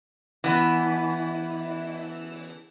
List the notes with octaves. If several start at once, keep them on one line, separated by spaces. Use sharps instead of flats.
E3 B3